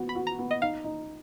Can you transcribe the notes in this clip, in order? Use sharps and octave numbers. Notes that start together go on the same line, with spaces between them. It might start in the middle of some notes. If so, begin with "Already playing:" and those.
Already playing: B3 F#4
B5
F#4
A#5
B3
D#5
D#4 F5
D#4